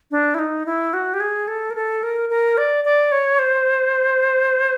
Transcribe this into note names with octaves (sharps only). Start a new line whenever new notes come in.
D4
E4
D#4
E4
F#4
G4
G#4
A4
A#4
A4
A#4
A#4
D5
D5
C#5
C5